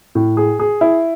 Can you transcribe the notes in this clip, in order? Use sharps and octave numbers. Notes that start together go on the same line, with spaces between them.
A2
G#4
G#4
E4